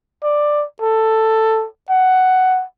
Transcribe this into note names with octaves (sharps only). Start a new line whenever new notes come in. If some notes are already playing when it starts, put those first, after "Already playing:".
D5
A4
F#5